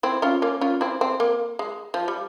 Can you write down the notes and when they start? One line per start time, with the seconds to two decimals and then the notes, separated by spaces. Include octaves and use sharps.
0.03 C4 E4
0.22 C#4 F4
0.42 A#3 C#4
0.61 C#4 F4
0.81 C4 E4
1.01 C4
1.20 A#3
1.59 G#3
1.94 F3
2.08 G3